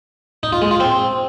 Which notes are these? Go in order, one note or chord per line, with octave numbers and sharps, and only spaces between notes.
D#4
F4
G#3
F4
C4